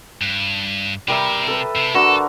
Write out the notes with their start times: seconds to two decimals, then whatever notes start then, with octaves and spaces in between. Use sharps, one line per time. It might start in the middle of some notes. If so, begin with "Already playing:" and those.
0.21 G2
1.08 C3 G3 A#4 E5
1.47 A4 B4
1.76 C3
1.94 D3 F#4 A4 A#4